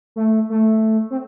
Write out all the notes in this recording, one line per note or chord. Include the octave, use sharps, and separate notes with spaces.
A3
A3
C4